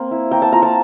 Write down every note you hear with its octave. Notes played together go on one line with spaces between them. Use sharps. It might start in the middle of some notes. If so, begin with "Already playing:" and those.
Already playing: A#3 C4
E4
A#3 G5
A5
F4 A#5
A5